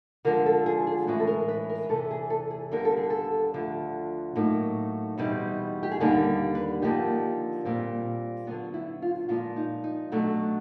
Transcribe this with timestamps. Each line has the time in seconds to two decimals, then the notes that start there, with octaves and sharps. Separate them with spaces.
0.25 D3 F3 G#3 A#4
0.46 A4
0.66 G#4
0.87 G#4
1.07 A2 E3 G#3 C#4 F#4
1.20 A4
1.27 A#4
1.48 B4
1.69 A#4
1.89 E2 C3 E3 A4
2.11 G#4
2.30 A4
2.50 G#4
2.71 D#2 D3 G3 B3 A#4
2.85 A4
2.97 G#4
3.10 A4
3.54 D2 D3 F3
4.36 A2 F#3 A#3 D#4
5.18 E2 B2 G3 C4 D#4
5.83 G4
5.91 G#4
6.00 D#2 D3 G3 A#3 D#4 A4
6.55 B4
6.82 D3 F3 A#3 D#4 G4
7.65 A#2 G3 C4
8.47 D3 F#3 B3 F4
8.74 E4
9.02 F4
9.29 A#2 F3 G#3 F4
9.56 D#4
9.84 D#4
10.12 B2 F#3 A3 D4